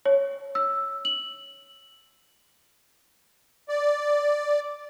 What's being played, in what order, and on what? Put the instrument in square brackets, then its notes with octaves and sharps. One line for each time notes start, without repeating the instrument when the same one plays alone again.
[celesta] C#5
E6
F#7
[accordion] D5